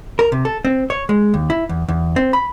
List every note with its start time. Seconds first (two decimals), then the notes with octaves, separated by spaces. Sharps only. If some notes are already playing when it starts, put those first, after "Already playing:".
0.19 A#4
0.32 C3
0.45 A4
0.65 C4
0.90 C#5
1.09 G#3
1.34 D#2
1.50 E4
1.69 E2
1.88 E2
2.16 C4
2.33 B5